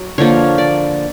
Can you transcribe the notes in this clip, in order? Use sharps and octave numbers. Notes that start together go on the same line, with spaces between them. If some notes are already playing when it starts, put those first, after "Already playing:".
Already playing: F#3
D3 F3 A#3 C#5
D5